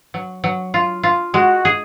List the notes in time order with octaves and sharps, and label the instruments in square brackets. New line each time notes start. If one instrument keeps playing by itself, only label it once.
[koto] F#3
F#3
F4
F4
[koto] G#3 [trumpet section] F#4
[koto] G#4